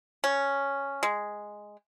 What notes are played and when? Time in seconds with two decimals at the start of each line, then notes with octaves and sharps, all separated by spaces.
0.24 C#4
1.03 G#3